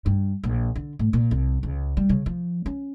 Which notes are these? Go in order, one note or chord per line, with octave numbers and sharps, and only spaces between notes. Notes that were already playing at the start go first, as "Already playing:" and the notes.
G2
A#1
D3
A2
A#2
C2
C#2
G3
C#3
F3
C#4